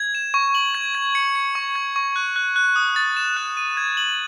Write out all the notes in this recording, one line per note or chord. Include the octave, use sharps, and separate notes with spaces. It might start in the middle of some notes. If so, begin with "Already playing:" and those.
Already playing: G#6
E7
C#6
F#7
G#6
G#6
C#7
C#7
C#6
G#6
C#6
F#6
F#6
F#6
D#6
A6
E7
F#6
D#7
G#6
F#7